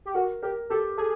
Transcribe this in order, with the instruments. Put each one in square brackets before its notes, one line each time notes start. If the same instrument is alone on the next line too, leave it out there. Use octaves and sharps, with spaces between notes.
[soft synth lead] G4
[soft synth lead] F#4 [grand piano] A#4
[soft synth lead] G4 [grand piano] A#4
[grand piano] G4 [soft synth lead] A4
[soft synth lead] G#4 [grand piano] A4